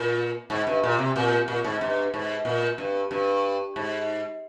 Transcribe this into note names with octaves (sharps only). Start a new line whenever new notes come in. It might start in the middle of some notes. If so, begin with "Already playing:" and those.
Already playing: A#2
G#2
G2
A#2
C3
A#2
A#2
G#2
G2
G#2
A#2
G2
G2
G#2